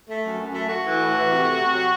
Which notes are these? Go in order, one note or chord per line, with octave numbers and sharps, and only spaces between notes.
A3
F#2
F#2
A3
A3 F#4
E3
A2
E3
C3
A3
C3
F#3